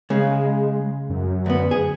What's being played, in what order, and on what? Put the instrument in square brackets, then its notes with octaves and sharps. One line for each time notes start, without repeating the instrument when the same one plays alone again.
[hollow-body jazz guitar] C#3 [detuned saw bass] G#3
[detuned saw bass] F#2
[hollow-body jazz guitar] D2 B3
G#4